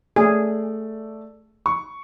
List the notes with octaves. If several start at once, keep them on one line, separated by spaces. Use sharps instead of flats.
A3 G#4 D5
C#6